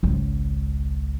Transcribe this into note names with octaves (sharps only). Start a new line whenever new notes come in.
G#1 C#2